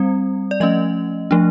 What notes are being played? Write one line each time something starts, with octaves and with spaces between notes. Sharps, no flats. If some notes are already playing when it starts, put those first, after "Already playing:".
Already playing: G3 C4
D5
F3 A3 C#4 D#5
F3 A3 D4